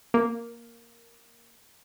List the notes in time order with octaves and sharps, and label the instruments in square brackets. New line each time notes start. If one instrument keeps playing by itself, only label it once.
[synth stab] A#3